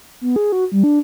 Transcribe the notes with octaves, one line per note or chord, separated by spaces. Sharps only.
B3
G#4
F#4
G3
D4